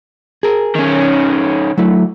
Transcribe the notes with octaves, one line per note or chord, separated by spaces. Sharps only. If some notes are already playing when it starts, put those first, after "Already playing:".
G#4 A#4
D#3 C#4
F#3 A3 E4